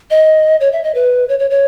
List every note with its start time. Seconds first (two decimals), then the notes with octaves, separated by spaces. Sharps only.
0.10 D#5
0.61 C#5
0.73 E5
0.84 D#5
0.95 B4
1.29 C#5
1.39 C#5
1.50 C#5